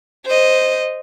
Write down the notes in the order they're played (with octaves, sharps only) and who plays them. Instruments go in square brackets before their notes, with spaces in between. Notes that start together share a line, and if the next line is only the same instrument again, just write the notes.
[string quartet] C5 D#5